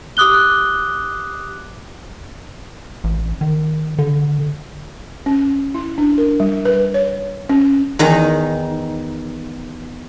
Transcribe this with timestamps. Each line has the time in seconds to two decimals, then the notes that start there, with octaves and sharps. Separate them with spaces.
0.17 G4 D6 D#6 F#6 G7
3.04 A1
3.41 D#3
3.98 D3
5.26 C#4
5.74 E4
5.98 D4
6.18 A#4
6.40 G3
6.65 B4
6.94 C#5
7.49 C#4
7.99 E2 D#3 D#4